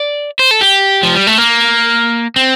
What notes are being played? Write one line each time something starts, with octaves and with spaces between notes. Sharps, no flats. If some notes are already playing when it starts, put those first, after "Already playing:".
Already playing: D5
C5
A4
G4
F3
G3
A3
A#3
C4